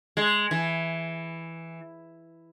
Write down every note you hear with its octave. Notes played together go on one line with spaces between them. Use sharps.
G#3
E3